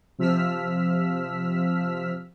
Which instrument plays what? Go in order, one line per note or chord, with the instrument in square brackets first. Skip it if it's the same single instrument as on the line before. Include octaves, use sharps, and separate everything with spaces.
[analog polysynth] C3 F3 E6 F6 B6